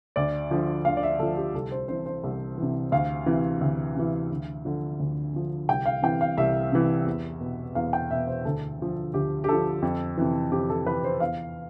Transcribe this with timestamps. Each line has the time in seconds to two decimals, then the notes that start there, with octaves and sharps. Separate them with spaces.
0.16 D2 D5
0.51 D3 F3
0.85 D2 F5
0.97 D5
1.03 E5
1.19 D3 F3 A4
1.37 G4
1.54 C2 A4
1.71 C5
1.88 C3 E3 C5
2.06 C5
2.24 C2
2.58 C3 E3
2.92 D2 F5
3.26 C3 E3
3.61 D2
3.96 C3 E3
4.31 D2
4.65 D3 F3
4.99 D2
5.34 D3 F3
5.68 C2 G5
5.86 F5
6.02 C3 E3 G5
6.21 F5
6.37 C2 E5
6.72 C3 E3
7.06 E2
7.41 B2
7.75 E2 F5
7.93 G5
8.10 B2 E5
8.27 C5
8.45 D2 A4
8.79 D3 F3
9.14 D2 G4
9.44 G4
9.49 D3 F3 A4
9.82 F2
10.18 C3 E3
10.52 F2 G4
10.70 A4
10.86 C3 E3 B4
11.04 C5
11.20 E2 F5